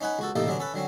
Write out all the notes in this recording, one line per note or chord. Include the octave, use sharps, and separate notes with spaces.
C#4 D#4 B4 F#5 G#5
C#2 F#4 A4
A1 A2 C3 A#3 D#4 A4
D3 F#3 B3 C#4 D4
C#4 A4 B4
D3 F#3 C4 C#4